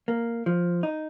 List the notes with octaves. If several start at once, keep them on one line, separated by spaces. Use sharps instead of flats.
A#3
F3
D#4